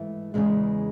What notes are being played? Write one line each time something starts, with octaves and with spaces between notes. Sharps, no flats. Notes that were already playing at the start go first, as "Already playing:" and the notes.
Already playing: G#2 E3 A3
E2 C#3 E3 G#3